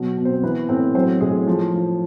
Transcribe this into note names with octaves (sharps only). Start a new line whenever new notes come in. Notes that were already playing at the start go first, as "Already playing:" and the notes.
Already playing: B2 F#3
B2
C4 C5
E3 B3 B4
A2 C4 C5
F#3 C4 C5
A2 G#3 G#4
F3
F3